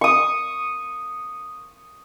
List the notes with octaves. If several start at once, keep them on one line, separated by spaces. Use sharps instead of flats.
C#6 D#6